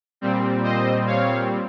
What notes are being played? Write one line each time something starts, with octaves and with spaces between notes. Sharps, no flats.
A#2 G3 C4
C5 D#5
C#5 F5